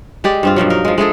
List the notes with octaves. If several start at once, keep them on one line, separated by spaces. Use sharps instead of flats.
G#3 G4 D5
G2 C4 F4
G2 B2 F3 F#3
D#4 A#4
F3 G#3
G#3 A3 G#4 A4